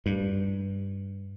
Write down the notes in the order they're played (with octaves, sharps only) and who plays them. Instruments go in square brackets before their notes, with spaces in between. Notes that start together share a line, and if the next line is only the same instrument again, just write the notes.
[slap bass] G2